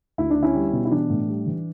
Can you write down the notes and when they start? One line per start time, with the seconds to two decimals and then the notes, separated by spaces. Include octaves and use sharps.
0.18 D2 E4
0.30 D4
0.36 D3
0.43 C#4 E4
0.55 G3
0.72 B2
0.85 E4
0.91 E3 D4
1.10 A2
1.28 G3
1.46 E3